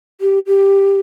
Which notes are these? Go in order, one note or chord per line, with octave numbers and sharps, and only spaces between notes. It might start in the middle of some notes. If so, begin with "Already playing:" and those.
G4
G4